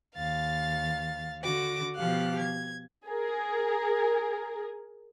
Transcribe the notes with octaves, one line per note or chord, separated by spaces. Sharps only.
D#2 F5 A6
D3 F#4 D6 A#6
B2 F3 G4 F5 F#6
G#6
G#4 A#4